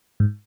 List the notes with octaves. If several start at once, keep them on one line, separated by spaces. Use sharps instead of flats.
G#2